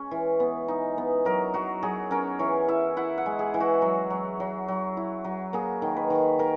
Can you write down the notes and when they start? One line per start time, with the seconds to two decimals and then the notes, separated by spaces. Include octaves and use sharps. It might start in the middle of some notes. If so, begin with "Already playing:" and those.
Already playing: G#3 C#4
0.11 E3
0.40 B3
0.68 D#4
0.98 B3
1.25 F#3 A#4
1.54 F#3 F#4
1.83 F#3 G#4
2.11 C#4 A#4
2.39 E3 C#5
2.68 E4 E5
2.97 E4 F#5
3.18 F#5
3.26 G#3
3.39 G#4
3.54 E3
3.60 F#4
3.82 F#3
4.10 F#3
4.40 F#3
4.68 F#3
4.97 E4
5.24 F#3
5.53 A#3 G#4
5.82 D#3
5.96 B4
6.10 D#3
6.39 D#3 A#4